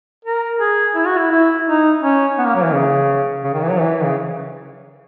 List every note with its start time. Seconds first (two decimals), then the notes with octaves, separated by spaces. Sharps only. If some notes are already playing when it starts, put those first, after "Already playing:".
0.25 A#4
0.60 G#4
0.95 E4
1.07 F#4
1.17 E4
1.31 E4
1.66 D#4
2.02 C#4
2.38 B3
2.46 A#3
2.55 F#3
2.64 E3
2.73 C#3
3.44 C#3
3.53 D#3
3.63 E3
3.71 F#3
3.80 E3
4.04 C#3